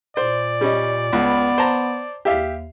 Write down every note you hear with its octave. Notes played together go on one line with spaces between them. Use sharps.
A#2 C5 D5
G3 C#4 D#5
C#2 B3
C5 A5 A#5
D#2 G4 E5 F5